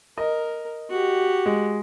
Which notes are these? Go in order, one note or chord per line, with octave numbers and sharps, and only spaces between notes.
A#4 D#5
F#4 G4
G#3